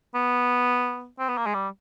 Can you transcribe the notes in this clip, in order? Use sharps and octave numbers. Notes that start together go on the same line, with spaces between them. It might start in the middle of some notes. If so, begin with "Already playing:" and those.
B3
C4
B3
A#3
G#3
G3